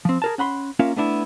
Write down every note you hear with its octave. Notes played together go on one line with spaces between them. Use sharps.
F3 C4
G#4 A#4 A5
C#4 F#5 B5 C6
A#3 C#4 F4 A#4 E5 F5
A3 B3 D4 E4